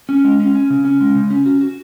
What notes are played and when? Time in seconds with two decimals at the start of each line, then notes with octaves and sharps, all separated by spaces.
0.09 C#4
0.24 G#3
0.40 C#4
0.55 C#4
0.70 C#3
0.85 C#4
1.01 G#3
1.15 C#3
1.30 C#4
1.46 F#4
1.61 F#4